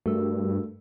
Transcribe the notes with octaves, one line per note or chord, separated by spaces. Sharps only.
G2 A3 F#4 A#4 E6